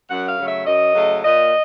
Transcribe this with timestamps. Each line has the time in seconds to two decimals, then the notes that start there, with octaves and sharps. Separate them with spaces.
0.10 F#2 F#5
0.28 F5
0.38 C#3 F#3 A3
0.48 E5
0.66 F#2 D#5
0.94 C#3 F#3 A3
1.23 A#2 D#5